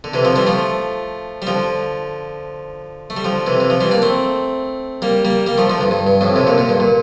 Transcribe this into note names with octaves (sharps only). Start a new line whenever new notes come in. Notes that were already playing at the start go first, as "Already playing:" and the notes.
D3
C3 E3
D3 F3
E3 G3
F3 A3
G3
D3 F3
A3
G3
D3 F3
C3 E3
E3
F3
E3 G3
A#3 D4
A3 C4
G3 A#3
G3 A#3
G3 A#3
F3 A3
D3 F3
G2
G2
G2
F2 A2
A2 C3
A#2 D3
A#2 D3
G2
A#2